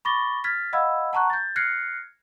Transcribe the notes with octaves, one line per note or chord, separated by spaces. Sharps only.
B5 C#6 D6 A6 A#6 G7
F6 G#6 A6 B6
D#5 F5 F#5 B5 E6 G#6
F#5 A5 A#5 C#6 F#6
G6 A6
F6 F#6 G#6 A#6 C7 C#7